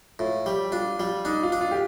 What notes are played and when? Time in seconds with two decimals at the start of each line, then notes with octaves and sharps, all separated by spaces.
0.19 A2 F4
0.46 G3 G4
0.72 D4 F4
0.99 G3 F4
1.25 D4 D#4
1.43 F4
1.52 D4
1.61 F4
1.71 G4